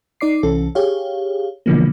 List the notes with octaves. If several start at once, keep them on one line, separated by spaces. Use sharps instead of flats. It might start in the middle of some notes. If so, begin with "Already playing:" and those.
D#4 D5 D6 C7
C2 E3 C#4 A4
G4 G#4 C#5 F5
B2 D3 E3 F3 G#3 A#3